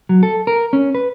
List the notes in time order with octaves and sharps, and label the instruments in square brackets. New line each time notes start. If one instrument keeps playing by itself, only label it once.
[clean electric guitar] F#3
A4
A#4
C#4
B4